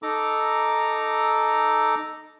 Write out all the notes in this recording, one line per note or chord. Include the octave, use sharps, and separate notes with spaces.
D#4 A4 A#5 D6